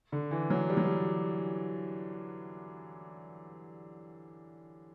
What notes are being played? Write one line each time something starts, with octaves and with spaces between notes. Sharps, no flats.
D3
E3
F#3
G3
F#3
G3